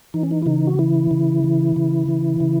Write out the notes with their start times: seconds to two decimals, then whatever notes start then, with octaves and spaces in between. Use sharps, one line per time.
0.14 E3 D#4
0.23 C#4
0.31 D#4
0.42 E4
0.46 C#3 D#4
0.67 F#4
0.79 E3 E4
1.11 C#3
1.44 E3
1.76 C#3
2.08 E3
2.40 C#3